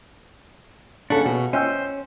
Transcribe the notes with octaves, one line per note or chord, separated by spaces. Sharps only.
C#3 C#4 D4 A4 F#5 B5 C#6
B2 F#4
C#4 C5 D#5 G5 E6